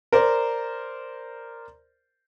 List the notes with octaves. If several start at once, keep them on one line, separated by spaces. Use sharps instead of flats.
A#4 C5 D5